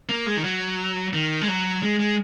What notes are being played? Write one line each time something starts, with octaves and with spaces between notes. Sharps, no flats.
A#3
G#3
D#3
F#3
D#3
G#3
F#3
G#3
G#3